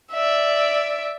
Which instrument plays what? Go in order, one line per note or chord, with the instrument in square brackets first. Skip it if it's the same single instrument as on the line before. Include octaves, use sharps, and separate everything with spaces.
[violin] D5 E5